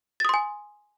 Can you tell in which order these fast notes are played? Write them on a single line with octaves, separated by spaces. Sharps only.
A6 D#6 C6 G#5